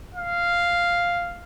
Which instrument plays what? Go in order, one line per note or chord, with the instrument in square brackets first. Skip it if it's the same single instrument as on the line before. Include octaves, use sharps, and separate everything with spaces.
[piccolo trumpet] F5